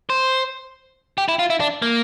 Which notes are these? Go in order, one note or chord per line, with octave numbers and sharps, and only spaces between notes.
C5
G4
E4
F4
E4
D4
A#3